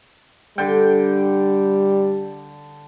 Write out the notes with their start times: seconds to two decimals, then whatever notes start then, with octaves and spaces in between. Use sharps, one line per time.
0.58 D3 G3 G5